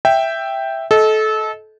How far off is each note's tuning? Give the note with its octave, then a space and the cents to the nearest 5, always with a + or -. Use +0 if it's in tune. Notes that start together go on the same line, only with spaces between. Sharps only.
E5 +0 G5 +0
A4 -25 D#5 +25